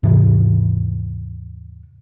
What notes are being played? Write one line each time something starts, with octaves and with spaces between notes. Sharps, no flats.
D#2 G#2 C3 E3